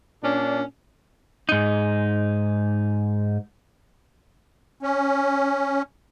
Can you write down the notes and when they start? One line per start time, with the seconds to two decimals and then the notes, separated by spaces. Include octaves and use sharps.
0.23 A#2 C#4 D4
1.49 G#2 D#4
4.82 C#4